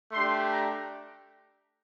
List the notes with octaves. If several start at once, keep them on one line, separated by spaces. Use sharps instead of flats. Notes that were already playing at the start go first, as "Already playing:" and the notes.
A3 D4 G4 C6
A#5